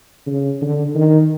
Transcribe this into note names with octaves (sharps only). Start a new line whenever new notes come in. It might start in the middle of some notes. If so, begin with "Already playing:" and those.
C#3
D3
D#3